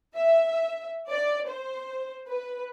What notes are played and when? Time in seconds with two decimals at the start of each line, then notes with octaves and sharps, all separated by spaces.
0.16 E5
1.10 D5
1.47 C5
2.28 B4